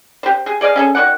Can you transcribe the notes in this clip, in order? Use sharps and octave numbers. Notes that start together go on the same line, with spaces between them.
G4 C5
G#4
G#4 D5 D#5 F5
C#4 G#4 A4
D#3 F#4 D5 F#5